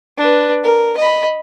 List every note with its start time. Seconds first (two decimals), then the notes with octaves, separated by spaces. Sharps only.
0.18 D4 B4
0.64 A#4
0.97 D#5 B5